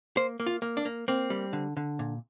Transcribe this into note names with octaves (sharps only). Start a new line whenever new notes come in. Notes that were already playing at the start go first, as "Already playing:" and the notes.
A#3 C5
A#3
F4
A#3
D4
A#3
A#3 C4
G3
D3
D3
A#2